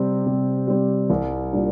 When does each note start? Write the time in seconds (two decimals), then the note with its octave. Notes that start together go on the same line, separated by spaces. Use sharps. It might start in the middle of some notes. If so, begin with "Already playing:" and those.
Already playing: C3 G3 C4
0.26 C3
0.67 G3 C4
1.10 C2
1.52 A#2 G3 D4